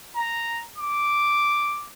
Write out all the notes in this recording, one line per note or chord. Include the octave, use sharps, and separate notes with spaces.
A#5
D6